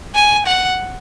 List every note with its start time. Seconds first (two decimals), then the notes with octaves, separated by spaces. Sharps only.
0.15 G#5
0.46 F#5